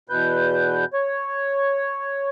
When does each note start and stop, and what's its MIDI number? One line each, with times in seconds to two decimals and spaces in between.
0.09 0.85 40
0.09 0.85 47
0.09 0.85 71
0.09 0.85 91
0.93 2.30 73